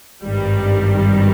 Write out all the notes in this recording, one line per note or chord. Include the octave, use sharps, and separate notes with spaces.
G#1 G2 D#3 G3